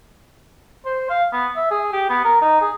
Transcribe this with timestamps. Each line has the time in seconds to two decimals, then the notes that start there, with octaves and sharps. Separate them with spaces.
0.86 C5
1.10 F5
1.33 B3
1.56 E5
1.71 G#4
1.93 G4
2.09 B3
2.24 A#4
2.41 D#4
2.61 G#4